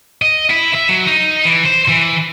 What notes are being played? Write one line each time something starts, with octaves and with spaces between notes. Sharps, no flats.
D#5
E4
E5
F#3
D#4
E3
C5
E3